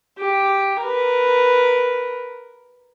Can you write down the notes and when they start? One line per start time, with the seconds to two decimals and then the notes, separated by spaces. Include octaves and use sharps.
0.18 G4
0.81 A#4 B4